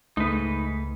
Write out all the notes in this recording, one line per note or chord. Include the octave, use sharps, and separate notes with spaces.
C#2 G#2 A3 D#4 B4